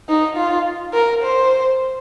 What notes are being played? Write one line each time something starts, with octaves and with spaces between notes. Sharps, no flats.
D#4
F4
A#4
C5